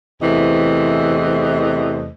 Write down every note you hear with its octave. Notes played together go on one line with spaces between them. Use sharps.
E2 C3 E3 A3 C5 D#5